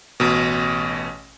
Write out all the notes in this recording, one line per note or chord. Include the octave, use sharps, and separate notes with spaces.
A1 B2